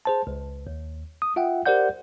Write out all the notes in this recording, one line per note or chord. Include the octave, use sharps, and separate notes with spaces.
G#4 C5 A5
C#2
D#2
D#6
F4 E5 F#5 G5
G4 A#4 C5 D5 F#5 G6